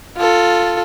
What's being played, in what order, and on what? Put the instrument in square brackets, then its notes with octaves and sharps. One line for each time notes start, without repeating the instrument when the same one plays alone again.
[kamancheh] F4 A4